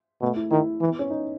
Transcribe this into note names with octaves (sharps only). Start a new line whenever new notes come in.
B2 A3
E4
D#3 E4
E3
B3
C#4
D#4